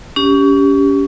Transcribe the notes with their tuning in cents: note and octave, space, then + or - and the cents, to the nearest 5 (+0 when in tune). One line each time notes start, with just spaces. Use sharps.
C#4 +30 G4 +0